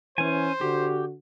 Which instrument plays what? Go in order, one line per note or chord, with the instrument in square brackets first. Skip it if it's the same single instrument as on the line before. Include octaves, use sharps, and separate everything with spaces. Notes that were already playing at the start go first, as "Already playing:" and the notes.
[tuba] E3 [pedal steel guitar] C#4 G#5 [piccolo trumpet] C5
[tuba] D3 [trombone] F#4 [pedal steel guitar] G4